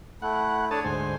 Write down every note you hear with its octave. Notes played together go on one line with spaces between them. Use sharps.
A3 E4 F#5
D4 A4 C#5 A5 D#6
D2 G#2 C5 G#5